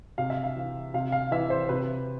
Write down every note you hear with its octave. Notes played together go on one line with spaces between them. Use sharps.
C3 F5
E5
F5
E3
C3 F5
F5
E3 E5
C5
C3 B4